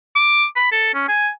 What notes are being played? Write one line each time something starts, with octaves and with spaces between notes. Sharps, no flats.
D6
B5
A4
C#4
G#5